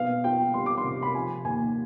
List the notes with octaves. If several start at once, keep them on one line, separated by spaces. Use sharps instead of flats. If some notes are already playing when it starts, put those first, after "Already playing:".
Already playing: B2 B3 F5
F4 G5
G3 C6
D6
C6
C3
B5
F3 G#5
D#2 G#5